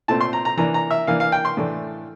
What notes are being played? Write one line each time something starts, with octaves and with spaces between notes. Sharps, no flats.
A#2 A3 C4 A5
C6
A#5
A#5
E3 A#3 D4 A#5
A#5
E5
E3 A#3 D4 F5
F5
G5
C6
A2 E3 A3 D4